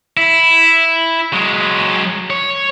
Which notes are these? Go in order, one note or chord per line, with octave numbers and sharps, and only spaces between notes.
E4
F#3 G#3
C#5